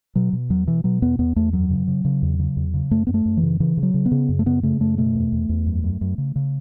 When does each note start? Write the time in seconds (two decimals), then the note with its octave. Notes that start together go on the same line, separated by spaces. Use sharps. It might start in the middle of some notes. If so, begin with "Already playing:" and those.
0.15 B2 F#3
0.33 B2
0.50 E2 F#3
0.67 B2 E3
0.84 B2 F#3
1.02 E2 B3
1.19 E2 B3
1.36 E2 A3
1.53 F#2 F#3
1.71 C#3
1.88 C#3
2.05 C#3
2.22 E2
2.39 C#3
2.56 E2
2.74 C#3
2.91 F#2 A3
3.07 F#2 B3
3.14 A3
3.25 F#2
3.37 E3
3.43 C#3
3.60 C#3 E3
3.77 C#3
3.83 F#3
3.94 C#3
4.06 B3
4.12 C#3
4.29 F#2
4.39 A3
4.46 C#3 B3
4.63 C#3 A3
4.80 F#2 A3
4.97 B2 A3
5.15 E2
5.32 E2
5.49 E2
5.66 F#2
5.84 F#2
6.01 F#2
6.18 C#3
6.36 C#3